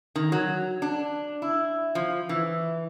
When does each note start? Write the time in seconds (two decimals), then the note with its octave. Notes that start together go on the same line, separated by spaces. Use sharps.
0.15 D#3
0.32 F#3
0.82 D4
1.42 E4
1.95 F3
2.29 E3